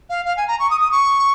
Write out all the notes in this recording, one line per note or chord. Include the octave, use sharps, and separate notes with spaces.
F5
F5
G#5
A#5
C#6
D#6
D#6
C#6